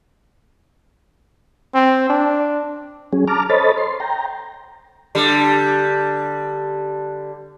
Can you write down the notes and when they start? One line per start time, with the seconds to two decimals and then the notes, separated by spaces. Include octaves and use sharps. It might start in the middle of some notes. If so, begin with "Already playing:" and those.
1.74 C4
2.10 D4
3.13 F#3 C#4 G#4
3.28 A5 A#5 D6 F6
3.50 A4 C5 C#5 D#5 B5 A6
3.77 C6
4.00 G5 A#5
5.15 D3 G3